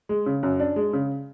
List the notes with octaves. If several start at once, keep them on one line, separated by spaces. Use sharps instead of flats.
G#3
C#3
F#2
D4
G#3
C#3